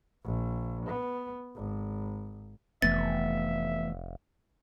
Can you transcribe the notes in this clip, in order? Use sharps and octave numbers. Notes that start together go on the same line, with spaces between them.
A#1
B3
G#1
F1 E3 A3 B3 E5 A6